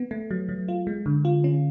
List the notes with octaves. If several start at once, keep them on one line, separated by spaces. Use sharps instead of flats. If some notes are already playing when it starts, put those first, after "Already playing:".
Already playing: B3
A3
F#3
F#3
F4
G#3
D3
F4
C#4